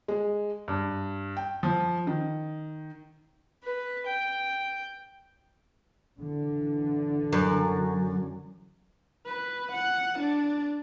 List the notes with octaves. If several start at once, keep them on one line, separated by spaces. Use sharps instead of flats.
G#3
G2
G5
F3
D#3
B4
G5
D3 E3
F#2
B4
F#5
D4